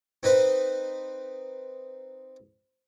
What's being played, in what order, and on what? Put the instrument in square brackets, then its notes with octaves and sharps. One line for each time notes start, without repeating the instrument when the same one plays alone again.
[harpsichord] C4 D#4 B4 C5